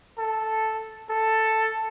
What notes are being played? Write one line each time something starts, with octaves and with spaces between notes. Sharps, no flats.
A4
A4